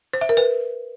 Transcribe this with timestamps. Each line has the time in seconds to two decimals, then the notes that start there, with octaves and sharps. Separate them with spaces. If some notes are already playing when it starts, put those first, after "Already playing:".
0.14 C5
0.21 E5
0.29 A#4
0.37 B4